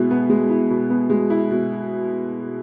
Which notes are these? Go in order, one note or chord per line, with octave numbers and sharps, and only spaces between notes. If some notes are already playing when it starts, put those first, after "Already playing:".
Already playing: B2 G#3 B3 E4
B3
G#3
E4
B2
B3
G#3
E4
B2